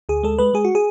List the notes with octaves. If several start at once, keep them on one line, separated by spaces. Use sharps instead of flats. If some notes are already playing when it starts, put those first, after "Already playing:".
D2 G#4
G#3 A4
G#3 B4
G#3 G#4
F#4
G#4